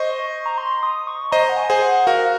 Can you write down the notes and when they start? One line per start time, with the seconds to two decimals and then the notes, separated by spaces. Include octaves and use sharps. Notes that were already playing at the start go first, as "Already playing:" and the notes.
Already playing: C5 D#5 C#6
0.46 A#5
0.58 C6
0.83 D#6
1.07 C#6
1.32 C5 D#5 A#5
1.49 F#5
1.57 G#5
1.70 G#4 C5 G#5
1.82 F#5
2.06 F#4 A#4 F5